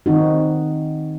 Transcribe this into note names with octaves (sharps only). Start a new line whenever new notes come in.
D#3 C4 D#4 F#4